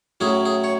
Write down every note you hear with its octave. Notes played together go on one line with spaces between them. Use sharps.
A2 F#3 C#4 E4 G#4
G#4
C#5